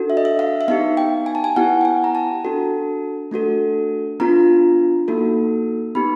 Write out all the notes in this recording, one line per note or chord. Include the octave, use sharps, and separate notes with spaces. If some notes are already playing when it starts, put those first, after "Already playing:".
Already playing: D4 F#4 A4
E5
D#5
E5
F5
E5
B3 D#4 G4 F5
G5
G#5
A5
G#5
B3 E4 G4 F#5
G5
G#5
A#5
A5
D4 F#4 A4
A3 D4 F#4 A4
B3 D4 F4 A#5
A#3 D#4 F#4 A4
B3 D#4 G4 B5